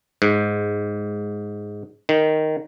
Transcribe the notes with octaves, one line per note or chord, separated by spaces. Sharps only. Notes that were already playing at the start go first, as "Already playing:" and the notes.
G#2
D#3